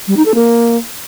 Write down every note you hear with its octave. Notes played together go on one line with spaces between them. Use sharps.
G3
D#4
A4
A#3